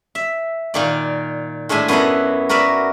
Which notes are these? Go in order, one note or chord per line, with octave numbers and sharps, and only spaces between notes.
E5
A#2 D#3 D5
A2 G#3 D4 E5 G#5
F#2 B3 E4 A4 D#5
F#4 A#4 B4 D5 E5